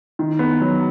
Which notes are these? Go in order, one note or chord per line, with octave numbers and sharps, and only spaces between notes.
D#3
B3
F#3